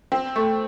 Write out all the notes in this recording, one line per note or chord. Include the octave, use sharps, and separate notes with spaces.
C4
A3